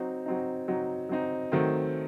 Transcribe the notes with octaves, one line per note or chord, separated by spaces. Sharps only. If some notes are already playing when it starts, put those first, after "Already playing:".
Already playing: F#3 C4 D#4
F#3 C4 D#4
F#3 C4 D#4
F#3 C4 D#4
D#3 F#3 A3 C4